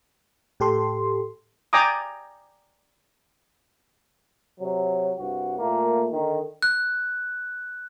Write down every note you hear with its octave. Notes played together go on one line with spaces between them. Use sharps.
A2 G4 A4 C6
D5 G5 G#5 A#5 D6 D#6
C3 F#3
C2 G2 F#4
A#2 A3 A#3
D3 D#3
F#6